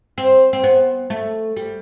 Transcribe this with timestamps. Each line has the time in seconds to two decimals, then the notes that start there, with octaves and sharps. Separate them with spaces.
0.18 C4
0.53 C4
0.64 B3
1.10 A3
1.56 G3